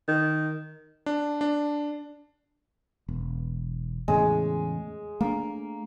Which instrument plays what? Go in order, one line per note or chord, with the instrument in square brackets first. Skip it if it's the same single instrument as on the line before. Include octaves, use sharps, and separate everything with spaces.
[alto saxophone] D#3
[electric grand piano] D4
D4
[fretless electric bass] E1
[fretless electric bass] E2 A2 C#3 [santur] G#3
[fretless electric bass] A3 D4 [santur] A#3